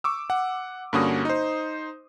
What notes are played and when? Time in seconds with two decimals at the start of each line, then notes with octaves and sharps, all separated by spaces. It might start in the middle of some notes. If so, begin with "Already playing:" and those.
0.04 C#6 D6 E6
0.30 F#5
0.93 G2 D3 A#3 C#4 F#4 D#6
1.25 D#4 C5